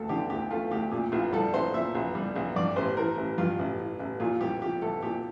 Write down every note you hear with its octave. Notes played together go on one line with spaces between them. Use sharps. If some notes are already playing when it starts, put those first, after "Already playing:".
Already playing: D2 A3 A4
D3 G4
D2 G4
A3 F4
D2 G4
A#2 G4
A#1 F4
G3 A4
A#1 C5
A#2 E5
A#1
G3
A#1
G2 D5
A1 C5
E3 A#4
A1
G2 F4
A1
E3
A1
A#2 F4
C2 G4
F3 G4
C2 A4
A#2 G4